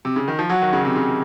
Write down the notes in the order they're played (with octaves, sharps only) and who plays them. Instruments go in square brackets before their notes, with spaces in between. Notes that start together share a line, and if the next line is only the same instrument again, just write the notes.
[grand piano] C3
C#3
D#3
F3
[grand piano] F#3 [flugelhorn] F#4
[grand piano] D#3
C#3
C3
C#3